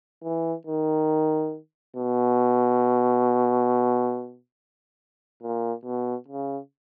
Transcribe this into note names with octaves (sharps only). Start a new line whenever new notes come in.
E3
D#3
B2
A#2
B2
C#3